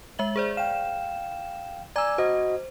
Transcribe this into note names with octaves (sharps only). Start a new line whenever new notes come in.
G#3 E5 F#7
G#4 C5 D5
F5 G5 E7
D5 G#5 A#5 D6 E6 G#6
F#4 C5 D#5